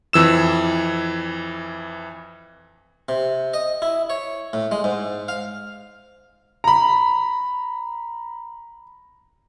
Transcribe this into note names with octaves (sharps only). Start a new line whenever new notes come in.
F2 E3 E6 E7
C3
D#5
E4
C#5
A2
G#3
G#2
F5
A#5 B5